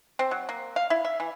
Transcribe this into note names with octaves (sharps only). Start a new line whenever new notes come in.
C4
F#3
A#3
F5
E4
E5
E3